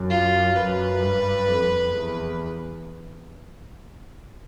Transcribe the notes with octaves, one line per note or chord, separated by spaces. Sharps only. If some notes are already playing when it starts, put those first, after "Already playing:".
Already playing: F#2
F4
F#2 B4
G2
F2
E2